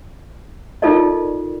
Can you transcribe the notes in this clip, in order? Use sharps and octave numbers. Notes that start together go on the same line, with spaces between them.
D#4 F4 A4 A#4 D5 D#5